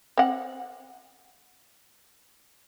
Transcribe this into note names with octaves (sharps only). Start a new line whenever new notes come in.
C4 F#5